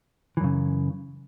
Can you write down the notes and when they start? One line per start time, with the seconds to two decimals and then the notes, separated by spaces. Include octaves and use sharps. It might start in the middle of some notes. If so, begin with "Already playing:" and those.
0.37 E3
0.41 F#2
0.44 C#3